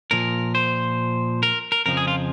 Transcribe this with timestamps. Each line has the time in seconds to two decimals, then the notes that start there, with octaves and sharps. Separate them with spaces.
0.11 A#2 F3 A#4
0.55 C5
1.43 A#4
1.72 A#4
1.86 F2 C#3 F3 A#4
1.97 G#4
2.08 F4